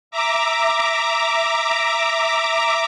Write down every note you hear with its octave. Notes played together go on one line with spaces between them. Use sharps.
E5 A#5 D6